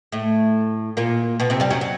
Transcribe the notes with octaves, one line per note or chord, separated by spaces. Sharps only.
A2 A3
A#2 A#3
B2 B3
C3 C4
G2 G3
F#2 F#3
F#3